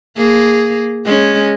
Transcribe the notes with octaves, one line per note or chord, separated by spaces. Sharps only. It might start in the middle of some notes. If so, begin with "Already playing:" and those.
A#3 G#4
G#3 C#4